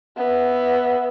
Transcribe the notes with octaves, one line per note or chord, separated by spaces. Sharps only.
B3 E5